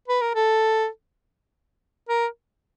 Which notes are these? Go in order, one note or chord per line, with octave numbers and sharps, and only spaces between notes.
B4
A#4
A4
A#4